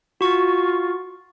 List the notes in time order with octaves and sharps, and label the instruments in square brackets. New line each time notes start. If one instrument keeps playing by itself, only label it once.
[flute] F4 [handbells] F#4 C#6